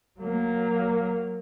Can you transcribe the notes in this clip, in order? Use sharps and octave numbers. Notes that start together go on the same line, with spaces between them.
F#3 A#3